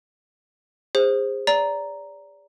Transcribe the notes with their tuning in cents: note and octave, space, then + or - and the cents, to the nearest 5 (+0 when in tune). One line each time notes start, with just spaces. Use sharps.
G#4 -35 C5 +5
D5 -25 A#5 +0